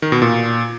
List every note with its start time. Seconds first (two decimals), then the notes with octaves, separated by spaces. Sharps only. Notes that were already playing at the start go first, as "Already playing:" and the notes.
0.02 D#3
0.12 B2
0.22 A#2